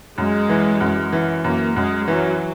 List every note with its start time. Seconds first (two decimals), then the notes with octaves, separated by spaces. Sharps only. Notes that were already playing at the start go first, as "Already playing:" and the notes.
0.18 F#2 G#3
0.49 E3
0.80 F#2
1.13 E3
1.44 F#2 A#3
1.76 F#2 G#3
2.08 E3 F#3